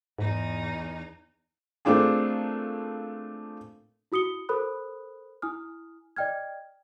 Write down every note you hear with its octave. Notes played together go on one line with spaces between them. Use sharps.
E2 G#2 D#4
A3 A#3 C4 D4 F4 G#4
E4 F#4 D#6 C#7 G7
A4 A#4 C5 B5 D#6 F#6
E4 G#5 D#6 F6
D5 D#5 G5 F6 G#6